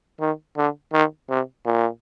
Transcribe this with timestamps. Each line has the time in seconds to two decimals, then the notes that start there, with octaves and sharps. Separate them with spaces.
0.20 D#3
0.57 D3
0.93 D#3
1.30 C3
1.66 A#2